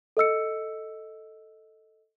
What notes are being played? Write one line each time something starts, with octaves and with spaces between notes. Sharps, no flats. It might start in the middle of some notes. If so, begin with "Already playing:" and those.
A4 D#5 E6 C#7